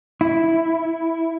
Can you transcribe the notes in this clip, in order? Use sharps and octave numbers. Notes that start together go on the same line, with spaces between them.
E4